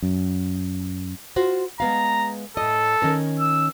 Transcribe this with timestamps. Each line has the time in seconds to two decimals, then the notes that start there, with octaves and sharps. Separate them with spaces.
0.02 F#2
1.36 F4 F#4 C5
1.80 G#3 B3 F5 A#5
2.57 A2 A4 D#5
3.02 D#3 C#4 A#4
3.40 E6